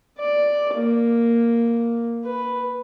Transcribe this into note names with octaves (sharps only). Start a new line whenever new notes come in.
D5
A#3
B4